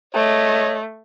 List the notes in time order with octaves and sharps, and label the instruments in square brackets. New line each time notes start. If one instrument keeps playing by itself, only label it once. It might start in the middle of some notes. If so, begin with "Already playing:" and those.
[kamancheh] A3 [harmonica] C#5 D#5